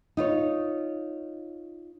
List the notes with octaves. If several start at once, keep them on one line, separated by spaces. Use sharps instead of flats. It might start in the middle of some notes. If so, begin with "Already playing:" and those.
D#4 F4 C#5